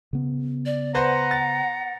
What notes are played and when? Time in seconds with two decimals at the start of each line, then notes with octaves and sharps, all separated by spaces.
0.13 C#3 B3
0.66 D5
0.95 B4 C5 F#5 A#5
1.31 A6